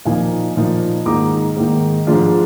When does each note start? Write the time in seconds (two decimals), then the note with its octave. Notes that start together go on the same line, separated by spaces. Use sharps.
0.05 A#2 F3 A#3 D#4 F5 G#5
0.56 A#2 F3 A#3 D#4
1.06 G#2 D#3 A#3 D#4 A#5 D6
1.56 G#2 D#3 A#3 D#4
2.07 G#2 F3 G#3 D4 F4